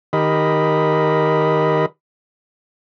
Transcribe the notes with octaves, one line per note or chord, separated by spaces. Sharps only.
D#3 G4 A#4 D#5 B5